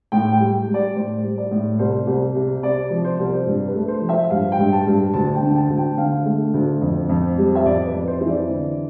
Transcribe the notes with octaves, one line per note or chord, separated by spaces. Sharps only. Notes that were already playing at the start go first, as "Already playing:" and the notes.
A2 G5
G5
G3
G3
D5
A2 C5
G3
D5
A2
C2 C5
C2
C3
C3 D5
F3
C5
C2
G2
B4
A3
C5
F3
E5
G2 F5
G5
G2
A5
G2
D2 A5
G5
D3
A5
D2
G5
D3 F5
A3
D2
F2
F2
G3
E5
F2 D5
B4
F2
C5
E3
D5
D3